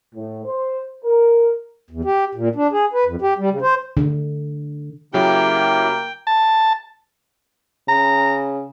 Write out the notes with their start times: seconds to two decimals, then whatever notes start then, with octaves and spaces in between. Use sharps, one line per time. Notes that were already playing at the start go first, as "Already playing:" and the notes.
0.15 A2
0.46 C5
1.04 A#4
1.91 E2
2.05 G4
2.35 A#2
2.55 D4
2.72 G#4
2.93 B4
3.05 F2
3.22 G4
3.38 G3
3.50 C#3
3.62 C5
3.97 D3
5.14 C#3 F#3 A#3 E4 G4 G5
6.27 A5
7.88 C#3 A#5